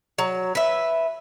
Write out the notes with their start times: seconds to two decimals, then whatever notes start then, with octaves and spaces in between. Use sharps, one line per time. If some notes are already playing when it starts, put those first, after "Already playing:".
0.18 F#3
0.55 B4 E5